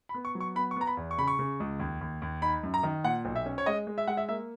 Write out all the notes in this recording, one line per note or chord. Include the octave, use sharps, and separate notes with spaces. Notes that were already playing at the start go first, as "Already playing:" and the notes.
B5
B3
C#6
F#3
C#6
B3 B5
C#6
B3 A#5
B5
E2
C#6
C#3 B5
C#6
C#3
C#2
D#2
D#2
D#2
D#4 B5
F#2
A#5
D#3
A#2 F#5
B1
E5
C#4
C#5
G#3 D#5
G#3
E5
G#3 F#5
E5
A#3 E5